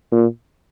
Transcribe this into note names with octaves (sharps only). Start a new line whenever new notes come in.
A#2